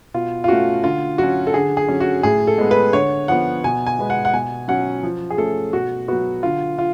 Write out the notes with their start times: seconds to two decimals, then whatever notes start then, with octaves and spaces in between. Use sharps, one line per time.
0.14 B2 F4
0.44 F4
0.48 A3 C#4 F#4
0.84 D3 F4
1.18 F#3 C#4 F#4
1.47 A4
1.54 D3 G#4
1.77 G#4
1.88 F#3 C#4
2.00 F#4
2.23 A2 G#4
2.47 A4
2.58 G#3 B3
2.71 B4
2.93 D3 C#5
3.28 F3 B3 F#5
3.64 B2 G#5
3.87 G#5
3.99 G#3 B3
4.10 F#5
4.25 F#5
4.33 B2 G#5
4.68 F#3 C#4 F#5
5.03 F3
5.30 G#4
5.38 A3 C#4 A4
5.73 B2 F#4
6.08 F#3 B3 F#4
6.43 D3 F4
6.78 F4